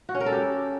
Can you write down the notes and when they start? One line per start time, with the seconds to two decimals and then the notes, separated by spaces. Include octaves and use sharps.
0.09 F#4
0.15 C#4
0.20 A#4
0.26 A4
0.32 G4